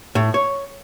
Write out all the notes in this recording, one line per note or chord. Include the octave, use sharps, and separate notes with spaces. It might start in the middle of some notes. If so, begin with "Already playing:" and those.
A2
C#5